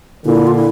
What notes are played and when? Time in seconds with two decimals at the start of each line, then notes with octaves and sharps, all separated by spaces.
0.25 A#2 D3 E4
0.47 F4
0.56 E4